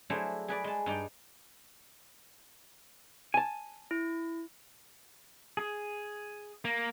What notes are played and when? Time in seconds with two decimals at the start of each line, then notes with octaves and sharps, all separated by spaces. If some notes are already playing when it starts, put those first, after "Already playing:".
0.10 F#3 A3 D4 E4 G#4 C5
0.48 G#4 B4 D5
0.64 G#3 A5
0.86 G2 D#4 D5 G5
3.34 G#5 A5
3.91 E4
5.57 G#4
6.65 A#3